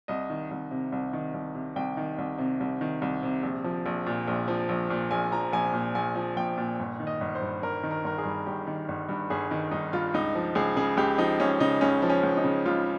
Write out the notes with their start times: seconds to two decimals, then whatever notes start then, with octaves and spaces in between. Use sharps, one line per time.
0.08 C2 D#5
0.30 D#3
0.51 C2
0.71 C3
0.92 C2
1.13 D#3
1.34 C2
1.55 C3
1.76 C2 G5
1.97 D#3
2.18 C2
2.38 C3
2.60 C2
2.81 D#3
3.02 C2
3.23 C3
3.43 A#1
3.64 F3
3.86 A#1
4.06 A#2
4.28 A#1
4.48 F3
4.69 A#1
4.90 A#2
5.11 A#1 G#5
5.32 F3 A#5
5.53 A#1 G#5
5.74 A#2
5.95 A#1 G#5
6.16 F3
6.36 A#1 G5
6.58 A#2
6.79 G1
7.00 D#3
7.07 D#5
7.21 G1
7.35 C5
7.42 G2
7.62 G1 A#4
7.83 D#3
7.91 A#4
8.04 G1 A#4
8.18 G#4
8.25 G2
8.46 G1 G4
8.67 D#3
8.88 G1
9.09 G2
9.30 G1 G#4
9.51 D#3
9.71 G1 D#4
9.93 G2 F4
10.14 C#2 D#4
10.35 F3
10.55 C#2 G#4
10.76 C#3 G#4
10.97 C#2 G4
11.18 F3 D#4
11.40 C#2 C#4
11.60 C#3 D#4
11.81 C#2 C#4
12.02 F3
12.09 C#4
12.23 C#2
12.37 D#4
12.44 C#3
12.66 C#2 F4